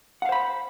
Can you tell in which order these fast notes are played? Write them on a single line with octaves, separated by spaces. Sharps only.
F#5 F5 C5 B5